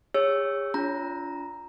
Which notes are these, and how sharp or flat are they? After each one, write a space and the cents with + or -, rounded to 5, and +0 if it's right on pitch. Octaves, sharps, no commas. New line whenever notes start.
G#4 -40 C#5 +0 E6 +0
D4 -45 F4 -5 A#5 +0